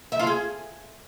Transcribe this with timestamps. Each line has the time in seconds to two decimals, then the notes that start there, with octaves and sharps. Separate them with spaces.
0.12 E5
0.19 F4
0.27 G#4